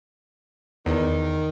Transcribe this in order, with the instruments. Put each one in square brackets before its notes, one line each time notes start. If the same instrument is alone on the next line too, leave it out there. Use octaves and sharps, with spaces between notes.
[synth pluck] E2 [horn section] D#3